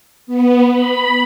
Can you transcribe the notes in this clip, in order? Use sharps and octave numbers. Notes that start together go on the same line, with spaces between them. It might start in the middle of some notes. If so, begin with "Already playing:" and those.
B3
B5